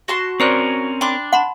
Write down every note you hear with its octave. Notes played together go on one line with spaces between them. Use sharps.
F#4 A5 C6
C4 C#4 A#4 C5 D5 F#6
D4 G5 B5 C6 D6
F#5 A5 B5 C6